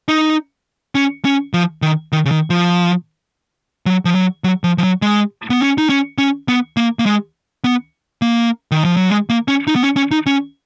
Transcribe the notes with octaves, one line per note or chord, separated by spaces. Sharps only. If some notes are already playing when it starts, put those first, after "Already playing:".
D#4
C#4
C#4
F3
D#3
D#3
C#3
D#3
F3
F#3
F3
F#3
F#3
F3
F3
F#3
G#3
B3
C#4
D#4
C#4
C#4
B3
A#3
A#3
G#3
B3
A#3
D#3
F3
F#3
G#3
A#3
C#4
D#4
B3
C#4
C#4
D#4
C#4